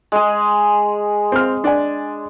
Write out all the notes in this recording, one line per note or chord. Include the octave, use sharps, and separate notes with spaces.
G#3 G#4
C4 F6
D4 D5 G#5